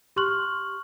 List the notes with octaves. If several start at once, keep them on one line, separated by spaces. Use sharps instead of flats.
G4 C6 C#6 F6 F#6 F#7